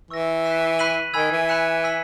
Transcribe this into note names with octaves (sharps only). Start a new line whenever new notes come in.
E3 C#6 E6 A#6
F#6 B6 E7
B5 F#6 B6 D#7 F#7
D#3 G#5 B5 E6 G#6
E3
B5 F#6 C#7 E7
B5 E6 B6 F#7